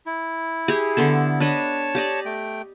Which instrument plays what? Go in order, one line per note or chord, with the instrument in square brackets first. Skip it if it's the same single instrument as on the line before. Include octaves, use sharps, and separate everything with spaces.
[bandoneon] E4
[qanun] G4 G#4
D3 B3 A4
[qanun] D4 B4 D#5 [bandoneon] C#5 A5
[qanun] G4 D5 D#5
[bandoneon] A3 G5